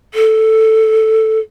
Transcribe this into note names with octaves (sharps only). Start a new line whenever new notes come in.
A4